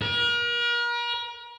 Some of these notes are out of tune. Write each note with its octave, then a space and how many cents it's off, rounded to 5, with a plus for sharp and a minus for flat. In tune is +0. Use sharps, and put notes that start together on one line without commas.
A#4 +40